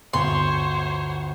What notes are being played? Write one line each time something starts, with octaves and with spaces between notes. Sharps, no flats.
G1 D2 C5 C#5 C6